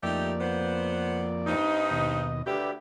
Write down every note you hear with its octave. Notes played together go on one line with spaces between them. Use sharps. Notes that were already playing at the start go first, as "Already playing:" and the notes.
F2 A3 A#3 D#4 G4 D5
B3 C5
G2 C4 D#4
D#2 B2 D#5
D2 G4 B4 D5 E5